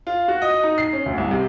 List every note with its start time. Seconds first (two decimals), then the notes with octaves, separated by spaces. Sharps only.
0.07 F4
0.28 F#4
0.42 D#5
0.64 D#4
0.78 C7
0.93 C#4
1.06 D2
1.18 C2
1.31 C3